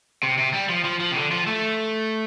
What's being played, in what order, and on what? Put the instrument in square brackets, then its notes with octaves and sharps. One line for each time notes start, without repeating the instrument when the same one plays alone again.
[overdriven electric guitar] C3
C3
G3
F3
F3
F3
C3
D3
F3
A3